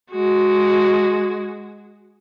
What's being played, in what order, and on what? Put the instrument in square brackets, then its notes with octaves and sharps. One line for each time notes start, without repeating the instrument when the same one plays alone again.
[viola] G#3 F#4